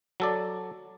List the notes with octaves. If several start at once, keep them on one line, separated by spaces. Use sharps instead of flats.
F#3 A4 D5